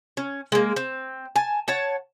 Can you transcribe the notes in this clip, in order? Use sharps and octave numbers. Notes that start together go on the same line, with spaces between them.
C#4
G#3 A#3
C4
G#5 A5
C#5 F#5 A5